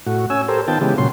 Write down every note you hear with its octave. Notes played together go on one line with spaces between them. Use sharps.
A2 F#4
C#4 G#5 E6
G4 A4 A#4 C5
D#3 B3 F4 G5 A5
C#3 E3 G#3 B3 G4
A#2 C#3 F#3 C6